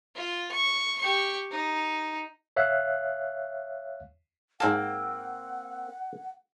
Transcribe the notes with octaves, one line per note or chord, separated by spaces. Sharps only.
F4
C#6
G4 C#6
D#4
C#5 E5 F5 F#6
G#2 A#3 C4 F#5 A5